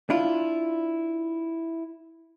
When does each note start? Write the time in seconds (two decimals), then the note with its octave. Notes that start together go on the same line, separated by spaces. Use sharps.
0.10 D4 E4 F4